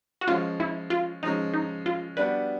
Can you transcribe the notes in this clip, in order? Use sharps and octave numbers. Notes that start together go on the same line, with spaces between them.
F#4
F3 G#3 C#4 F4
E4
F4
F3 G#3 C#4 D#4
D#4
F4
G3 B3 D4 F#4 B4